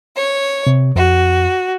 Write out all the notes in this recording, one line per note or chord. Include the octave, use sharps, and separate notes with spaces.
C#5
C3
F2 F#4